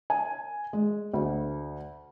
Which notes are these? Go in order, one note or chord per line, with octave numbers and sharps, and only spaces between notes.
G#5
G#3
D2